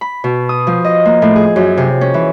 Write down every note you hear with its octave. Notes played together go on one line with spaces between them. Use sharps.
B5
B2
D#6
F3
D#5
A#3
A2
G#4
F#2
C3
C#4
E3